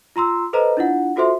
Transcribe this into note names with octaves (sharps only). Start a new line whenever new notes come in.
F4 A#5 C6 E6
A4 B4 C5 D#5 A#5
D4 E4 F4 F#5
F4 F#4 A4 C5 E5 C6